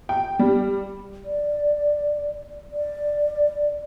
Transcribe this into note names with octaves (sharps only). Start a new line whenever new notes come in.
G5
G3
D5
D5